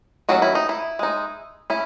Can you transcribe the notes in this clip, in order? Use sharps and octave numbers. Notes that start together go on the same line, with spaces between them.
D#3 F#3 C#4 F#4
E4
D#4
E4
G#3 D#4
C#4 E4